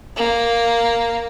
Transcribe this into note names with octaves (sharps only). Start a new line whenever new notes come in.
A#3